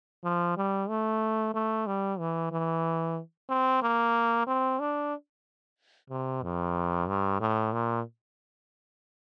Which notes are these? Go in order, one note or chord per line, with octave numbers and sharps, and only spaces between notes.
F3
G3
A3
A3
G3
E3
E3
C4
A#3
C4
D4
C3
F2
G2
A2
A#2